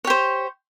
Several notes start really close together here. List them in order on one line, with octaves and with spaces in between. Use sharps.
C#5 G4 C5